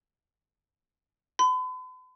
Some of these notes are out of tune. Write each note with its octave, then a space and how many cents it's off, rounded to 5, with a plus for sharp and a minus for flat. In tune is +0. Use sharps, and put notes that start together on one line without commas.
B5 +45